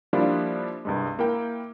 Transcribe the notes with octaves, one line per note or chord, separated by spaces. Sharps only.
F3 G3 A#3 D4 E4 F4
C2 G2 G#3
A#3 E4 A#4 G5